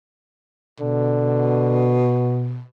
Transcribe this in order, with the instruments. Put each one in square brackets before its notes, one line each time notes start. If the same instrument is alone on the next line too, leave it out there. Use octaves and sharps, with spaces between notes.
[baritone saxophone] B2 [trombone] D3